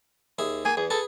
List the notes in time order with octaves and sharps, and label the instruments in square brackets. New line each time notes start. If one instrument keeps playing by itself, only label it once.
[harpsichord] D#2 G#4 E5
[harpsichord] A#3 [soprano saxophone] G#5
[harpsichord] E2 [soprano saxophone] G#4
[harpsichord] G#4 B4 [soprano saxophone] A4